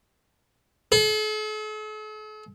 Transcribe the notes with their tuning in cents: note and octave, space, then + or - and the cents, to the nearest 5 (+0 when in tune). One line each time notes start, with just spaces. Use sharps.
A4 -45